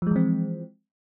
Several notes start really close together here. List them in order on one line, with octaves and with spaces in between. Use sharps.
F3 G#3 E3 C4